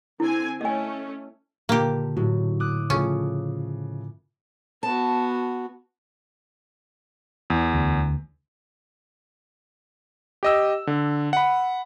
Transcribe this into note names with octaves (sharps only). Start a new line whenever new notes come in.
D3 C4 E4 G#5
A3 C#4 D#5 G#5
A#2 D3 A#3 G4
A2 F#3
D6 D#6 F#6
C#3 F3 A3 C#4
B3 F#4 A5
E2
D2
G4 D#5 E6
D3
F#5 B5